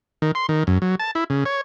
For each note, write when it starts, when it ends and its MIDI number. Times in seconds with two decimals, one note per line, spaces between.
0.22 0.32 51
0.35 0.46 84
0.49 0.64 51
0.67 0.78 42
0.82 0.95 54
1.00 1.11 81
1.15 1.24 64
1.30 1.44 49
1.45 1.61 73